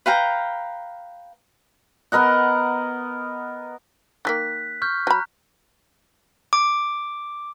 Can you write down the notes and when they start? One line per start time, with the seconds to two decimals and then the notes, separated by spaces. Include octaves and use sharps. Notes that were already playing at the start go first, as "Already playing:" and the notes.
0.06 B4 F5 G5 A#5
2.12 B3 A#4 D#5 F#5
4.25 D#3 G#3 A#3 F#6 B6
4.82 C#6 F6 G6
5.07 F#3 A#5 B5 F#6
6.53 D6